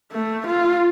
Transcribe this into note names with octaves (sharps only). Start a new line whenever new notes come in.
A3
F4